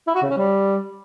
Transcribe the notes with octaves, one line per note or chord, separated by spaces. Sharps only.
E4
F#4
C#3
C#4
G3